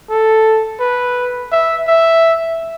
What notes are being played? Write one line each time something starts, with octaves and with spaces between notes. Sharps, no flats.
A4
B4
E5
E5